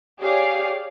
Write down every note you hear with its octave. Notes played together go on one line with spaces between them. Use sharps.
G4 G#4 C#5 D5 F5